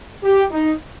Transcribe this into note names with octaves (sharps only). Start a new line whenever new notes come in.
G4
D#4